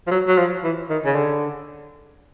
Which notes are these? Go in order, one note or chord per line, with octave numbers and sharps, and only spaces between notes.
F3
F#3
F#3
F3
E3
D#3
C#3
D3